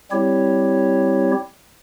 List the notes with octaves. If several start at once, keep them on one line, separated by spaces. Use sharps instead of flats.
G3 C4 E4 G4 C#5